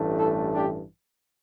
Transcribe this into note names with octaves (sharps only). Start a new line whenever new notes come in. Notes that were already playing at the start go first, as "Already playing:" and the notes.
Already playing: A1 G2 E3 A3
E4 A4
D4 G4